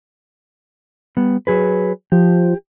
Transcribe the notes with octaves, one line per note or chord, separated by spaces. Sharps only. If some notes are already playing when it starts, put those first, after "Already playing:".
G3 B3
F#3 G#4 B4
F3 G4